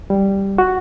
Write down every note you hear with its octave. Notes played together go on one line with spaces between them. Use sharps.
G3
F#4